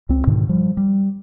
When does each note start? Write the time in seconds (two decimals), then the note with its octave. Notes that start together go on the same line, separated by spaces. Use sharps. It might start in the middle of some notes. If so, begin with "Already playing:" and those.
0.09 C#2 C4
0.27 G#2 B2 D3 D#3
0.49 F3 G3
0.77 G3